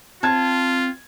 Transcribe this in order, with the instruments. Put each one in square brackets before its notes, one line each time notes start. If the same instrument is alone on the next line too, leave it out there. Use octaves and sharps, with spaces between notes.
[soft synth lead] C4 [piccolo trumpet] F4 [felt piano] A5 G#6